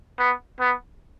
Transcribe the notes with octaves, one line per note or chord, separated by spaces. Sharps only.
B3
B3